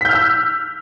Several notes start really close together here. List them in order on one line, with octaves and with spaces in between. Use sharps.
B6 G6 F6 E6